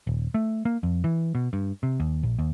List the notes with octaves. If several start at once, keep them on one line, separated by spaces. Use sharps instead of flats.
D#1
A3
A#3
F2
E3
B2
G2
C3
D#2
A#1
D#2